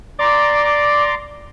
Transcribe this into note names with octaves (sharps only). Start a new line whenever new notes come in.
D5 A#5 C6 D6